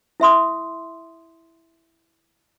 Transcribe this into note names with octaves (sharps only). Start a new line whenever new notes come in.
E4 E5 C6 D#6